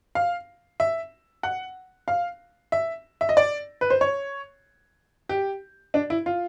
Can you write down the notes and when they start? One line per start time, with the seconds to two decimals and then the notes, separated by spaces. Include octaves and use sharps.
0.15 F5
0.80 E5
1.43 F#5
2.08 F5
2.72 E5
3.21 E5
3.29 D#5
3.37 D5
3.81 B4
3.90 C5
4.01 C#5
5.29 G4
5.94 D4
6.10 E4
6.26 F4